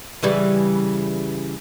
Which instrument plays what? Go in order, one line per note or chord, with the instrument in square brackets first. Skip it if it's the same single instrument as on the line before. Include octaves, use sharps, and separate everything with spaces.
[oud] C#3 E3 G3